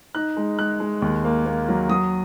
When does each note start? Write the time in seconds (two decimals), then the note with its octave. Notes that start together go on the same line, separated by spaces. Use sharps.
0.15 D#4 F#6
0.37 G#3
0.58 G#3 F#6
0.80 G#3
1.02 D#2
1.24 A#3
1.46 A#3
1.68 F#3
1.89 F#3 D#6